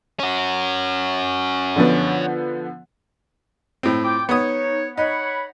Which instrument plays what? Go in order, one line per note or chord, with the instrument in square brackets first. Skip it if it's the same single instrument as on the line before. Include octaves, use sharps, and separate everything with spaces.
[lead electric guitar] C#4 F#4
[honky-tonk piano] D3 F3 B3
[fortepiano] A2 C4
[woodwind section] F4 G5 D6
[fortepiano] B3 D#6 [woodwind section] D#4 C#5
[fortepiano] D#4 [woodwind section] C#5 F#5 B5